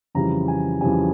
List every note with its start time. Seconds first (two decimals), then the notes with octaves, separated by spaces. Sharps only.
0.15 F2 C#3 E3 G3 A#5
0.48 G#5
0.81 F2 C#3 E3 G3 G#5